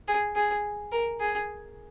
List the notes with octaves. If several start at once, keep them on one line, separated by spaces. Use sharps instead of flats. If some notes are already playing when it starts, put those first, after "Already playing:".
G#4
G#4
A#4
G#4